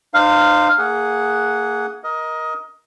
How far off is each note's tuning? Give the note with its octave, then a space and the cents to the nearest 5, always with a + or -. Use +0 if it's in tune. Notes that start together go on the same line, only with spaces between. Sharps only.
D#4 -45 C5 -15 F5 +0
A#3 -25 G#4 +0 F#5 -5
A#4 +20 D#5 +15